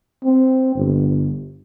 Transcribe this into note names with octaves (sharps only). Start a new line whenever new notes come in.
C4
G1